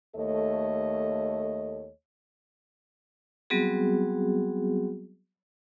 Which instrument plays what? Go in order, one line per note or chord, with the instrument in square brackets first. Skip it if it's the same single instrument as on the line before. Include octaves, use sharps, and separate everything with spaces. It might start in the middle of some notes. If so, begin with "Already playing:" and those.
[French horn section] D#2 A3 A4 C#5 D#5
[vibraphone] F#3 G3 B3 C4 F#4 G#4